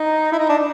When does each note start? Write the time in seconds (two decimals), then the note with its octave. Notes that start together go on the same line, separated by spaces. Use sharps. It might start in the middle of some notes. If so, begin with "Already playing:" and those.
Already playing: D#4
0.32 E4
0.39 D#4
0.49 D4